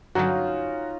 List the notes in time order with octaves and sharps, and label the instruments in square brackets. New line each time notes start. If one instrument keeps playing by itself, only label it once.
[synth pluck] G2 D3 F#3 [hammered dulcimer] C#4 D#4 F4 [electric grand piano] F#4 A#5